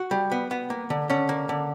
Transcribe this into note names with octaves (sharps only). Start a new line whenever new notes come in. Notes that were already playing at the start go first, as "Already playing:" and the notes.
Already playing: F#4 F#5
G3
B3
B3
A#3
D3
D3 C#4 C#5
A#3
D3